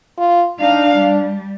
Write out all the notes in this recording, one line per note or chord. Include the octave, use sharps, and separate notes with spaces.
F4
D4 D#4 F5
G3